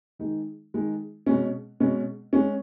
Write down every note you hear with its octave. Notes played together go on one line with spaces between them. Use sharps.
D#3 G#3 D#4
D#3 G#3 D#4
B2 G#3 C#4
B2 G#3 C#4
G#3 C#4